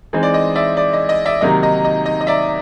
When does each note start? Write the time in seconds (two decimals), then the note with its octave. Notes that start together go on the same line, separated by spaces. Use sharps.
0.13 E3 G#3 C4 D#4
0.23 D5
0.34 D#5
0.55 D5 E5
0.77 D5
0.93 D#5
1.09 D#5
1.26 D5 E5
1.41 C3 D#3 F#3 A#3 D#4 D#5
1.63 D#5
1.85 D#5
2.06 D#5
2.21 D#5
2.27 D5 E5